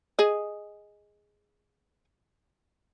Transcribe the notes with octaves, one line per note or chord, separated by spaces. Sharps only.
G#4 D#5